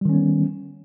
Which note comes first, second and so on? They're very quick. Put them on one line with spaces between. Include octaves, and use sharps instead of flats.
G3 D#3 C#4 B3